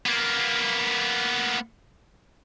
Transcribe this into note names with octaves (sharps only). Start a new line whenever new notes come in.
A#3 B3